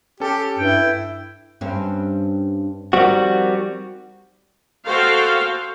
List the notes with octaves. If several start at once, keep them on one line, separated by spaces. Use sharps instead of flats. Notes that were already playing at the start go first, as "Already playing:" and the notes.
C#4 G4 A4
G2 E4 G5
G2 C4 C#4
D#3 F3 G3 C4 F#4
F#4 A4 C5 F5 G5